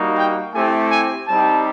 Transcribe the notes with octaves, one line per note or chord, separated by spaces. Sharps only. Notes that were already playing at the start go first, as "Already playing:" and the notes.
Already playing: G3 A#3 D#4 F#4
G5
A3 C4 E4 G4 G#5
G#5
G3 C4 D#4 G4 A5